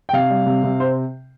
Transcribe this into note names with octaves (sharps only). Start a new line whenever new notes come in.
G5
C3 F5
G3
C3
C3
C5